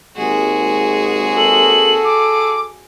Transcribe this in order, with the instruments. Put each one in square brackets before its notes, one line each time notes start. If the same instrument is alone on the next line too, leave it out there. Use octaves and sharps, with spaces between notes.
[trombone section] G#1 D#2 G#3 [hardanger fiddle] F#4 G#4
[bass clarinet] A4 [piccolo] F#7
[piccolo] D6